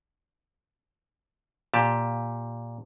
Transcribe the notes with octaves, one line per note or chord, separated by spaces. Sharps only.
A#2 G4 A5